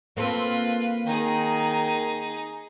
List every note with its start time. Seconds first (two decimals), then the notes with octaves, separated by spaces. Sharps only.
0.17 A#3 C4 F4 A4 B4
1.06 D#3 D#4 G#4